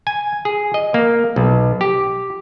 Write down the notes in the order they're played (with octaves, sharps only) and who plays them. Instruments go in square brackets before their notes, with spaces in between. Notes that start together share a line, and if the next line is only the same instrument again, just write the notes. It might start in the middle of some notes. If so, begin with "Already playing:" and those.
[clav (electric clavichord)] G#5
G#4
D#5
A#3
B1
G4